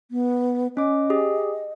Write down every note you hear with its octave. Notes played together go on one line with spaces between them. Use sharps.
B3
C#4 D#5 D6
G4 G#4